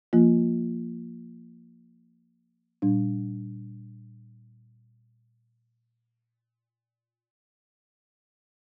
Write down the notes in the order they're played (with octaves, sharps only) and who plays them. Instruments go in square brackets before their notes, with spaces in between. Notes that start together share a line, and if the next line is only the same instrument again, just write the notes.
[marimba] F3 A#3 F4
A#2 G3 D4